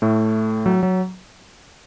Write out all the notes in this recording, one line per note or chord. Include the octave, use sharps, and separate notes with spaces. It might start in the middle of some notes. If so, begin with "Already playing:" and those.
A2 A3
F#3
F#3